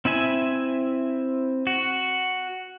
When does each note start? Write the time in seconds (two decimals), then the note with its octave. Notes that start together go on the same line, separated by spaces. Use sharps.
0.05 C4 E4 E5 G#5
1.67 F#4